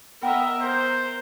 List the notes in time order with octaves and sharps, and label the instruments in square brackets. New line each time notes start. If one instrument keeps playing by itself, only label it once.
[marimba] B3 F#5 G5 [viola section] A#4 D#5 E5
[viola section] A#4 [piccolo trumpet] C5